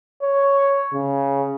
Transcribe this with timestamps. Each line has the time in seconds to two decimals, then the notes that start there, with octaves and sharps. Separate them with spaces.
0.22 C#5
0.94 C#3